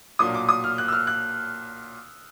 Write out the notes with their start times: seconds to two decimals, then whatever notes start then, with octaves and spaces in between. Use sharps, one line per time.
0.19 B1 A#2 F#3 A#3 D4 D#6
0.34 D6
0.49 D#6
0.64 F6
0.78 F#6
0.88 E6
0.93 F6
1.07 F#6